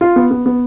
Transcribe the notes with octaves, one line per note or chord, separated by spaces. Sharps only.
F4
B3
B3
B3